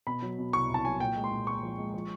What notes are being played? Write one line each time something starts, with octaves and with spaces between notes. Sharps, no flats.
B2 B5
F#3
B2
C2 C#6
C2 A5
F#3 G#5
A#2 G5
G#3
C6
A#2
G#3 C#6
F3
G#3
F3